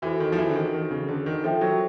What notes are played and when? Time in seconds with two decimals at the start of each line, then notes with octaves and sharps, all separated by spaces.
0.02 E3 F#4 A4 C5
0.20 D#3
0.32 F3
0.38 E3
0.50 D3
0.56 D#3
0.73 D#3
0.91 C#3
1.09 D3
1.26 D#3
1.44 F3 A4 C5 E5 G5
1.61 F#3